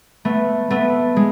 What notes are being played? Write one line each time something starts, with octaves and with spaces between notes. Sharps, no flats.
A3 B3
A3 B3
G#3